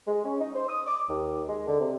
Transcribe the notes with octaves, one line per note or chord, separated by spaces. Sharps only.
G#3
C#4
D#4
C5
D#6
D6
D#2
G#3
D3
C3